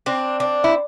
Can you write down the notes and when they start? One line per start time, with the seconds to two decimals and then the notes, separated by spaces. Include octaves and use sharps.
0.06 C4 D4
0.40 D4
0.64 E4